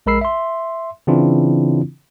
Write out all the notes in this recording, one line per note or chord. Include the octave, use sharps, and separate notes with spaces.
A#1 G#3 A#4 B5 E6 C7
E5 C6
C#3 E3 C4 D4 E4 F4